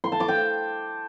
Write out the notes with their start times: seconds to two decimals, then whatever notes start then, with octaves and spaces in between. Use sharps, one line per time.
0.04 C6
0.12 A5
0.20 D6
0.28 G5